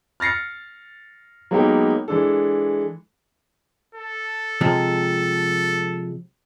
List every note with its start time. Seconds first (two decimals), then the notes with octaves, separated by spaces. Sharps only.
0.20 F6 A6 A#6 C7 C#7
1.51 F#3 G#3 A#3 B3 D#4 G4
2.08 E3 G#3 D4 A4
3.95 A4
4.61 C3 F3 G#3